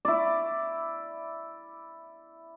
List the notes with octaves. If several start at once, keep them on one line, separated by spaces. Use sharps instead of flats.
E4 D5